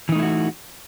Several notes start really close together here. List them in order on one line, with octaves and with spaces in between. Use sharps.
E3 D#4 A3 E4 F#4